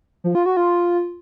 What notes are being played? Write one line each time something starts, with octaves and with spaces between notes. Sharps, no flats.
F3
F4
F#4
F4